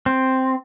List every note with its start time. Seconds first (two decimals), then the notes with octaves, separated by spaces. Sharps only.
0.06 C4